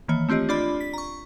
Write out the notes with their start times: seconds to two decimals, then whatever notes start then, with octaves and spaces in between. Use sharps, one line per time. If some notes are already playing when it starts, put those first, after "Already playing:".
0.08 D#3 E3 A#3 C#5
0.29 A3 C4 F4 G4 D#5
0.49 D4 F4 D5 B5
0.81 B6
0.93 A#5 C#6